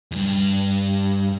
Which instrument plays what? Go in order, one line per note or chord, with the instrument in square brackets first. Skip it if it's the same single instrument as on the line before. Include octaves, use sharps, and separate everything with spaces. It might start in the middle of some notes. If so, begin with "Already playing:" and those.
[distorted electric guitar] E2 G2